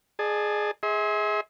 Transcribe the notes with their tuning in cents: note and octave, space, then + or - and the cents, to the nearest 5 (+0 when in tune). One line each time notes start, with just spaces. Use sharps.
G#4 +10 D5 +45 A5 +0
G#4 +0 E5 -45 C6 +10